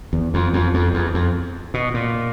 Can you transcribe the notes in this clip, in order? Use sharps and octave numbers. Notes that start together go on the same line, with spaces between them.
E2
F2
F2
F2
E2
F2
B2
A#2